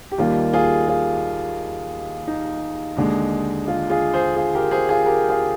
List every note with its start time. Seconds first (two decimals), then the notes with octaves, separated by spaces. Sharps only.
0.12 G4
0.18 D#2 D#3 G3 A#3 F4
0.53 F4 G#4
0.88 F4
2.27 D#4
2.97 D#2 D3 G#3
3.68 F4
3.90 F4 G#4
4.14 G#4 C5
4.36 F4 G#4
4.55 G4 A#4
4.71 G#4 C5
4.89 F4 G#4
5.06 G4 A#4
5.29 F4 G#4